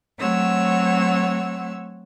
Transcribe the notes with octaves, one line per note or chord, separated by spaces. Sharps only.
F#3 A3 C4 C#5 F#5 E6